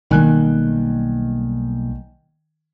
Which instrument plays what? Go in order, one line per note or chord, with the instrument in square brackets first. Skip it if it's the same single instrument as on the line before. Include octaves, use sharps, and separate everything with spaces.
[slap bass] B1 G3 A#3 [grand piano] D#3 G#5 F#6